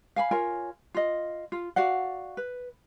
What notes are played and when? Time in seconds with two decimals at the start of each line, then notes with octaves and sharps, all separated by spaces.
0.16 F5 G#5 B5
0.31 F4 A#4 C#5 G#5
0.95 F4 D#5
1.52 F4
1.76 F#4 D5 F5 F#5
2.37 B4